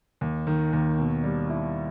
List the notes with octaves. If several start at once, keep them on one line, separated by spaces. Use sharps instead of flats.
D#2
D#3
D#2
B2
G3
E4